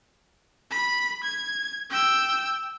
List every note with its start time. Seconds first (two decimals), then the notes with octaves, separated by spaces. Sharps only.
0.71 B5
1.23 G#6
1.90 G5 E6